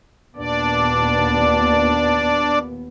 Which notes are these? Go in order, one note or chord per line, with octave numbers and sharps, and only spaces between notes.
D#2 A#2 B3 D4 D5